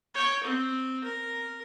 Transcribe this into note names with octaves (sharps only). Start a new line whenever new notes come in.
C#5 G5
C4
A#4